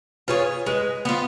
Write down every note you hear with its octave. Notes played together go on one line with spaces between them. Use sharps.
F4 G#4 B4 C#5
G#3 B4
B3 F4